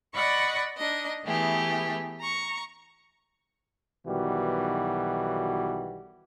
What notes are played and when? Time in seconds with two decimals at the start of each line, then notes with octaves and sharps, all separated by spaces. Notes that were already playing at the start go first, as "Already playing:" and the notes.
0.14 D5 D#5 F#5 B5 C#6
0.77 D4 D#4 D#5
1.25 E3 A3 B3 G4 G#4
2.20 A#5 C#6
4.05 B1 B2 D#3 E3 G3 F#4